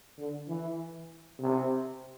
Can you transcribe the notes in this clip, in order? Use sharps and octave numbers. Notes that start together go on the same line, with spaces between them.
D3
E3
C3